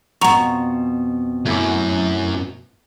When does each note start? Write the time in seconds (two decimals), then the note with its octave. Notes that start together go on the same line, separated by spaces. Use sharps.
0.21 F2 B2 F#5 A#5 C#6
1.46 F#2 A3 E4 D6